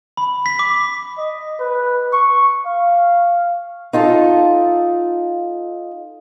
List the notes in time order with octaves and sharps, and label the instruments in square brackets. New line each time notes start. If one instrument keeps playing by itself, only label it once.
[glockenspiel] B5
B6
D6
[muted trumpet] D#5
B4
C#6
F5
[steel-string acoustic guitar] D#4 F4 A4 A5